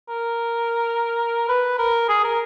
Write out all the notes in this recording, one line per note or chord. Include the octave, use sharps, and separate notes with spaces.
A#4
B4
A#4
G#4
A#4